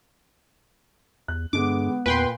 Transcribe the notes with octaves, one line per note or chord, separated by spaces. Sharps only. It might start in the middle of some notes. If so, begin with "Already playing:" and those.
E2 F#6
G2 D3 G#3 B3 D6
E2 A#2 B4 G5 C6